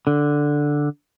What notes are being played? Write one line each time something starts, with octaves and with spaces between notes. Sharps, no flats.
D3